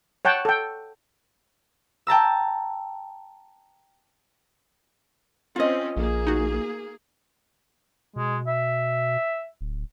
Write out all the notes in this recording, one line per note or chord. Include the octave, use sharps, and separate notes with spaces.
C#5 F#5 G5 A5
A4 G5
G5 A5 A#5 E6
C4 C#4 F4 D#5
A#1 A#3 G#4
D#4 F#4
B2 G#3
E5
D1